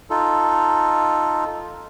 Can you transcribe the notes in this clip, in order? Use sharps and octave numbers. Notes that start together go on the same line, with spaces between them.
D#4 F4 A4